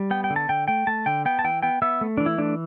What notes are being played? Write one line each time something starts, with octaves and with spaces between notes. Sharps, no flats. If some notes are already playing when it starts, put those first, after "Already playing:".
Already playing: G3
B3 G5
G5
D3
A5
D3 G5
A3 G5
A3 A5
D3 G5
B3 G5
A5
E3 G5
B3 G5
B3 E5
A3
E3 D4
E4
A3 D4